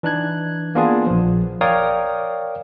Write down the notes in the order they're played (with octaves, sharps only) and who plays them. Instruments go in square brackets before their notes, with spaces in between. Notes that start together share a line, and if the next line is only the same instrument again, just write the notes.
[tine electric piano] E3 D4 D#4 F#6 G#6
A#3 B3 D4 F4 G#4
A#1 F3
A#4 C#5 D5 F5 G5 D#6